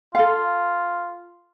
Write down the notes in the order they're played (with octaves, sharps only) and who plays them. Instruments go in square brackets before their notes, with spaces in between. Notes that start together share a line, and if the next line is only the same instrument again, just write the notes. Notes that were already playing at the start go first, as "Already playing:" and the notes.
[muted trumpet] F4 [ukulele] A4 F5